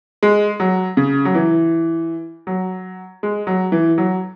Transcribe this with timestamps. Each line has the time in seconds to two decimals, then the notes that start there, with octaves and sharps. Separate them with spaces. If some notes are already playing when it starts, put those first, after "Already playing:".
0.23 G#3
0.60 F#3
0.97 C#3
1.25 F#3
1.34 E3
2.47 F#3
3.23 G#3
3.47 F#3
3.72 E3
3.98 F#3